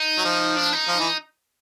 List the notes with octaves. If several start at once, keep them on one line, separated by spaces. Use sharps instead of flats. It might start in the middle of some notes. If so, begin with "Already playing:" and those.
Already playing: D#4
F#3
F3
D4
D#4
F3
E3